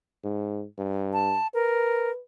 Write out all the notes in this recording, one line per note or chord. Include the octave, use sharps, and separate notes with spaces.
G#2
G2
A5
A#4 B4